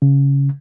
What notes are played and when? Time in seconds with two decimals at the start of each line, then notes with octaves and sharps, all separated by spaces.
0.02 C#3